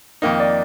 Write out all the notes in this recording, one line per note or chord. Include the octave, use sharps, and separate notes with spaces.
F2 D#3 A#3 D#4 D#5
D5